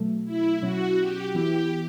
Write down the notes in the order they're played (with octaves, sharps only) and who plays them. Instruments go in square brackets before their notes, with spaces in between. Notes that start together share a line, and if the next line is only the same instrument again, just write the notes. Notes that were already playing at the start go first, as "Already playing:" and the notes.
Already playing: [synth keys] B2 F#3 A3
[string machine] E4
[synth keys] B2 F#3 C#4 [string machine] F#4
[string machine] G4
[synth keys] E3 B3 E4 [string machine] G4